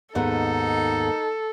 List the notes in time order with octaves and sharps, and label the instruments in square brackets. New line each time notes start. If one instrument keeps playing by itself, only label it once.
[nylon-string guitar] D#2 G#2 B3 [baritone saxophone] D#4 [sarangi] A4